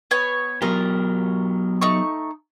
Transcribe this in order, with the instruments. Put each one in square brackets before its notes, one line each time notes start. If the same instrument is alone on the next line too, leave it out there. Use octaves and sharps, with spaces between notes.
[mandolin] B3 C#5 G#5
[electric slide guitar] F#3 B3 G4 [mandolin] F4 A#4 A#5
[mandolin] A3 D#4 C#6